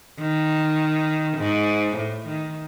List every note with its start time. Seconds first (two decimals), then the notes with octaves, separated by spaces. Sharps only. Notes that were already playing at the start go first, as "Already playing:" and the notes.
0.19 D#3
1.38 G#2
1.97 A2
2.27 D#3